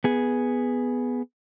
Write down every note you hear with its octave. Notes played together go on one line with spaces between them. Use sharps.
B3 G#4